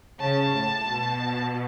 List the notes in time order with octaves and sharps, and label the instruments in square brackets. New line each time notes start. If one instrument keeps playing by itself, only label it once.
[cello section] C#3 [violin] A5
[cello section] A2
B2